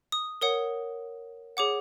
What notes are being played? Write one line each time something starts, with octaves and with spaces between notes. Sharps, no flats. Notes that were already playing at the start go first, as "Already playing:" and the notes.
D#6
A#4 C#5 F#5 D#6
G#4 C#5 F#5 D6